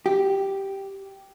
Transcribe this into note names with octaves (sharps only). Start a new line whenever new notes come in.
G4